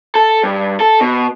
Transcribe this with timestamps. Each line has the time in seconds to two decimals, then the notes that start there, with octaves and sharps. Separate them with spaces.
0.15 A4
0.43 G2
0.80 A4
1.00 B2